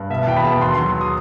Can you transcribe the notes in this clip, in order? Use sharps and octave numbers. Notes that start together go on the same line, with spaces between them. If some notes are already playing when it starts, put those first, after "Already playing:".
Already playing: G2
B2 E5
A5
E2 G5
B5
B2 A5
D#2 C6
F#3 C6
D#6